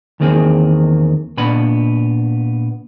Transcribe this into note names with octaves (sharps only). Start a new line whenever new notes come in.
E2 D#3 A#3 C4 G#4
A#2 B3 D4 B5